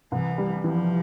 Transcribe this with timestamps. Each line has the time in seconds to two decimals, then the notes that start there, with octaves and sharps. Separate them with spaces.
0.12 C2 E3
0.38 G3
0.64 E3 F3